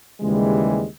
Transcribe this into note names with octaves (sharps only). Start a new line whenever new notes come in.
D#2 C#3 E3 G3 G#3